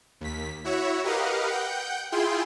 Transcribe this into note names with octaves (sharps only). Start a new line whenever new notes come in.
D#2 B6
E4 F#4 C#5 E5
G4 A#4 B4 D#5 F5 F#5
F#5 G5 G6
E4 F4 G#4 G5 C6